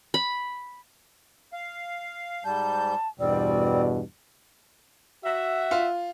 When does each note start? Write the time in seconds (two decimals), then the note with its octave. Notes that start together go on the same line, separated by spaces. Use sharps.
0.14 B5
1.53 F5
2.45 G#2 G3 A5 G6
3.20 E2 G2 B2 G3 C4 D5
5.24 F#4 E5
5.71 F4